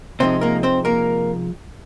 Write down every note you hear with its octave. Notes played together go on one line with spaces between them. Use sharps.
C3 F3 G#3 C4 D#4 C5
A#3 A#4
C4 C5
A#3 A#4